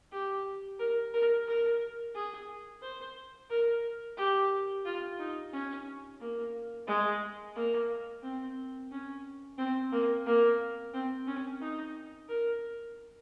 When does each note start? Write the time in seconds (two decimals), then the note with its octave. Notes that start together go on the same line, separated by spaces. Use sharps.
0.12 G4
0.79 A#4
1.14 A#4
1.47 A#4
2.15 G#4
2.83 C5
3.50 A#4
4.17 G4
4.85 F4
5.19 D#4
5.53 C#4
6.20 A#3
6.87 G#3
7.56 A#3
8.23 C4
8.91 C#4
9.58 C4
9.92 A#3
10.26 A#3
10.94 C4
11.27 C#4
11.61 D#4
12.28 A#4